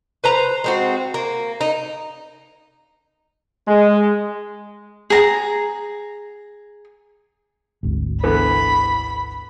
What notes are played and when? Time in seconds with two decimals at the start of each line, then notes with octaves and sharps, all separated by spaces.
0.24 B4 C5 A#5
0.64 G#3 C4 F#4
1.14 A#3
1.61 D#4
3.68 G#3
5.10 G#4 A#5
7.83 G#1 D2
8.23 D3 E3 B3 B5